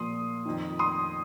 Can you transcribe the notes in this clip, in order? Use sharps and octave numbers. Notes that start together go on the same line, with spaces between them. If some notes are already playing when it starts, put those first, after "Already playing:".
Already playing: A#2 F3 C6 D#6
F2 D#3
C6 D#6